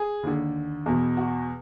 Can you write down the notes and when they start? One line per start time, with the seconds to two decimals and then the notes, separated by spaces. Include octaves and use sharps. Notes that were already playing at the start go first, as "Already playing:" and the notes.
Already playing: G#4
0.23 D#2 D3
0.86 E2 B2
1.17 F#4